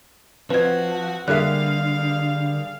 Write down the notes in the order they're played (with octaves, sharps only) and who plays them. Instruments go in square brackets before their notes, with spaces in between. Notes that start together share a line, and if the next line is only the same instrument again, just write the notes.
[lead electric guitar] F3 [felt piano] C4 D#5 [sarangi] F#4 [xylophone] B4 G#6
[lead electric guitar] D3 [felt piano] G3 A#3 G#4 [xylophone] E5 F#6 [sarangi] F5